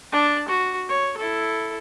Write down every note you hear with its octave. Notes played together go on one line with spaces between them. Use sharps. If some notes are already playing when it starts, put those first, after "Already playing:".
D4 A5
F#4
C#5
E4 A4